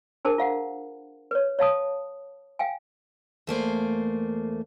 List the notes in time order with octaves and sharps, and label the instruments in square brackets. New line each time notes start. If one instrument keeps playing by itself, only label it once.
[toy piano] D4 G#4 A#4 C5 A5
F4 F5 F#5
B4 C#5
C#5 F5 A5 D#6
F5 G5 G#5
[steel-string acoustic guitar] E2 A3 A#3 C5